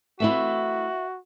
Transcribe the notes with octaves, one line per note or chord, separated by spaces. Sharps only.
A3 C4 E4 F#4 B4 E5